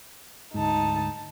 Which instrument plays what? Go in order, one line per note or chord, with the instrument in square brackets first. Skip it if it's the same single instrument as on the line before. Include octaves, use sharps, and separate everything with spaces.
[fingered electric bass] D2 G#2 [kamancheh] D#4 A5